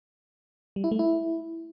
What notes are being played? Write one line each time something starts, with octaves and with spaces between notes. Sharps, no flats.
G3
E4
A3
E4